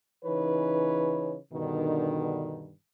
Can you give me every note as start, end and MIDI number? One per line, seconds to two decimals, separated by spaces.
0.25 1.36 49
0.25 1.36 52
0.25 1.36 63
0.25 1.36 71
0.25 1.36 73
1.53 2.73 43
1.53 2.73 47
1.53 2.73 50
1.53 2.73 51